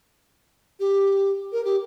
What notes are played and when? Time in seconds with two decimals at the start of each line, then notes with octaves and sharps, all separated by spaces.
0.80 G4
1.52 A#4
1.65 G4